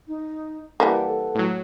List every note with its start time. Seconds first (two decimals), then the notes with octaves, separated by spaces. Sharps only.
0.07 D#4
0.80 E3 G3 A#3 B4 F#5 G5 A5
1.06 A4
1.35 A2 F#3